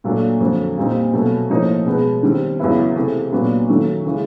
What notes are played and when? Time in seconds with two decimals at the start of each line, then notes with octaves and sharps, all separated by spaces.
0.04 A#2 F#3 A3 D4
0.40 F2 D3 F#3
0.77 A#2 G3 C4 D#4
1.13 B2 F#3 A3
1.50 A2 F3 A#3 D#4
1.86 B2 G#3 B3
2.23 D#3 G3 C4
2.59 E2 C#3 F#3 B3 E4
2.96 C3 E3 A3
3.33 A#2 F#3 B3 D4
3.68 D#3 F#3 A3
4.05 C#3 E3 G#3